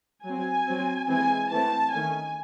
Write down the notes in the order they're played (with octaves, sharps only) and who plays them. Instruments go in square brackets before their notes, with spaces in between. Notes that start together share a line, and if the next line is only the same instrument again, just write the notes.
[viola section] F#3 C4 G#5
F#3 C4
E3 G#3 C4 G#5
E3 A3 C4 A5
D#3 A3 C#4 G#5